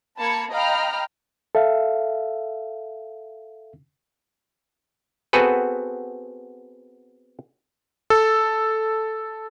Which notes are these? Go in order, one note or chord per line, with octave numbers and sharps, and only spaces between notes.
A#3 A5 B5 G#6 C#7
D#5 F5 G5 A#5 B5 F6
A4 E5 F5
B3 C4 F#4 G#4 A4 B4
A4